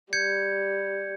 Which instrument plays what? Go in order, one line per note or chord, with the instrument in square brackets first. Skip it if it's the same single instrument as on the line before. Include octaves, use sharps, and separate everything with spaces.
[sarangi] G3 [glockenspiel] G6 G#6 C#7